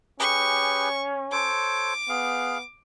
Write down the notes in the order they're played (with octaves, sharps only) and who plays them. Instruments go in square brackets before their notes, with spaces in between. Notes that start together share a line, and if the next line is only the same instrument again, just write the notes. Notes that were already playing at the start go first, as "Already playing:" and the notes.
[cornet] C#4 [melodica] G4 G#4 B4 [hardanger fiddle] C#6
[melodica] A4 C5 C#5 [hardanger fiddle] D6
[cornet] B3 [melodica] G#4 F5